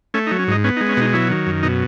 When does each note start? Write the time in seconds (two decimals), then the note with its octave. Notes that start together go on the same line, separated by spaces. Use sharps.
0.14 A3 C#4
0.27 D#4
0.31 F#3
0.39 C#4
0.48 G#2 D#4
0.64 B3 C#4
0.77 D#4
0.81 G#3
0.89 C#4
0.97 B2 D#4
1.13 F#3 E4
1.30 D#3
1.46 F#2
1.63 B2 D#4